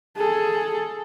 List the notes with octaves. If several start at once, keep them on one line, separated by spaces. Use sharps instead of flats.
G#4 A4